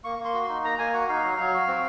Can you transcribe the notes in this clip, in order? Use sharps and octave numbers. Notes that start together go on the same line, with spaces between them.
A#3 C#6
A#3
C6
F#4
D#4 C6
A#3 A#5
A#3 G#5
F#4 F#5
D#4 F5
F#3
F#3
F#4
C4